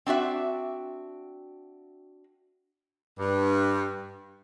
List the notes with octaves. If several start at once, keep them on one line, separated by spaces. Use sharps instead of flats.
C4 D4 F#4 E5
G2